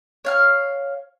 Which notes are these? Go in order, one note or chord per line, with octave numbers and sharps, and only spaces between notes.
C#5 F5 F6